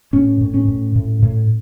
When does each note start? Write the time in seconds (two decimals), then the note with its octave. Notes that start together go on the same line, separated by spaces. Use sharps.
0.13 A2 C#4
0.41 A2
0.54 C#4
0.68 A2
0.96 A2
1.22 A2